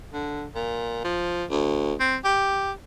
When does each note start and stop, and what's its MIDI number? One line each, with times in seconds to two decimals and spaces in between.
0.14 0.47 50
0.55 1.00 46
1.04 1.44 53
1.50 1.93 38
2.00 2.16 60
2.25 2.72 67